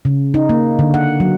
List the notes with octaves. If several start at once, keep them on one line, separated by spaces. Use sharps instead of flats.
C#3
D#4
A#3
D3
F#5
F#3